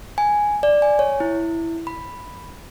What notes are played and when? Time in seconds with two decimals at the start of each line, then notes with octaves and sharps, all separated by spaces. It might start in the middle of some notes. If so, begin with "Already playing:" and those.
0.18 G#5
0.63 D5
0.82 G#5
0.99 C#5
1.20 E4
1.87 B5